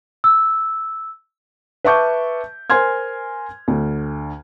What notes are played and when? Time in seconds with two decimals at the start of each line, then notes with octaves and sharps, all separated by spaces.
0.24 E6
1.84 B4 E5 A5 C#6 D6 G6
2.70 A#4 C5 G#5 C6 F6 G#6
3.68 D2